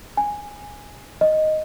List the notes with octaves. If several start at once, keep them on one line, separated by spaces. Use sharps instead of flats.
G#5
D#5